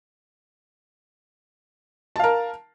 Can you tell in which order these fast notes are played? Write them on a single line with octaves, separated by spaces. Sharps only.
A5 F5 A#4